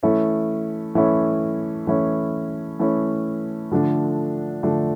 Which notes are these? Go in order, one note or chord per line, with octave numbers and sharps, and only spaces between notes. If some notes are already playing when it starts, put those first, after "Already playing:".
E3 A3 C#4 E4
E3 A3 C#4 E4
E3 A3 C#4 E4
E3 A3 C#4 E4
D3 F3 A3 D4
D3 F3 A3 D4